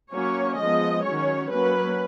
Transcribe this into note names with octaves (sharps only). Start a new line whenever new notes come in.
F#3 A#3 C#4 C#5
F3 G#3 B3 D#5
D#3 F#3 C#4 C#5
F#3 A#3 C#4 B4